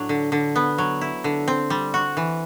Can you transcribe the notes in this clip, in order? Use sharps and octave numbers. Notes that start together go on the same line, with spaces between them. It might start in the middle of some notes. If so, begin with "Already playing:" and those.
Already playing: A2 F#3 D4
D3
D3
B3
F#3
E4
D3
C4
G3
F#4
E3